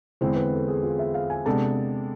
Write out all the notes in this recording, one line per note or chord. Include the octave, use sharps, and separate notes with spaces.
E2 D3 G#3 C4 E4 C5
B4
A4
G#4
F4
E5
F5
G#5
C3 G#3 B3 D4 A4 A5